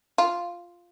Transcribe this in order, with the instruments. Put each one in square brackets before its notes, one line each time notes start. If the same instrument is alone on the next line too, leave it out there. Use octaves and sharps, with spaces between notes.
[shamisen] F4